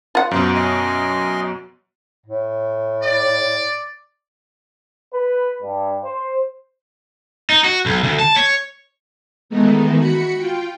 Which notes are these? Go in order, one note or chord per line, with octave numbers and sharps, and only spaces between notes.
F4 F#5
F#2 B2 C5
D#5 G#5 C6
A2
D5
B4
G2
C5
D#4
F#4
B1
D2
A5
C#5
D#3 E3 G#3 A3 B3 D#4
F#4 B5 C#7
F4 G5